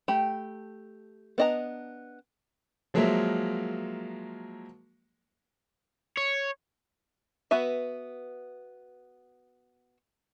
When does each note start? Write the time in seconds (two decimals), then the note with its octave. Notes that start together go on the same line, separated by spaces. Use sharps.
0.08 A3 G4 G5 B5
1.38 B3 D4 D#5 G#5 A#5
2.94 F3 F#3 G#3 A#3 A#4 E5
6.17 C#5
7.51 B3 F#4 B4 E5